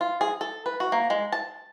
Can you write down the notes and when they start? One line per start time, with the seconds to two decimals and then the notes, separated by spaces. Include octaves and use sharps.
0.01 F4
0.21 G#4
0.41 A4
0.66 B4
0.80 F#4
0.92 A#3
1.10 G#3
1.32 A5